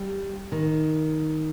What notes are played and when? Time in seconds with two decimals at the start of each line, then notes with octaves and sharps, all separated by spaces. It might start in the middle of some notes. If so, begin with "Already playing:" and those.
Already playing: G3
0.52 D#3